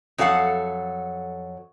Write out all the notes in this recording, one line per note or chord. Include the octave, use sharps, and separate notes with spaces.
F2 F#3 A4 F5 F#5